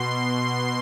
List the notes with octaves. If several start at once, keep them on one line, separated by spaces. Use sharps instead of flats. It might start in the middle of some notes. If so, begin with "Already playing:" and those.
Already playing: B2 C6